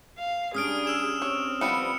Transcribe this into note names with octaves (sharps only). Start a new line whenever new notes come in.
F5
G3 C#4 D4 G#4 D#6 F6 D7
E6 E7
C4 C#5
F3 G3 B3 C#7